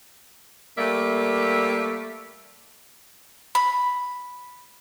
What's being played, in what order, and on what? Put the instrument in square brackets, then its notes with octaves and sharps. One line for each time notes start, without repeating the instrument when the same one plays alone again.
[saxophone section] G3 A3 A#3 D5 E5
[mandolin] B5